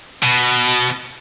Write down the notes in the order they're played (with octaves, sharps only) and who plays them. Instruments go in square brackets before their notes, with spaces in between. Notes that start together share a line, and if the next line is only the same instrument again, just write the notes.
[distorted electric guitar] B2